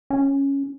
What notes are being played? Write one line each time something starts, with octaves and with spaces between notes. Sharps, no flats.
C#4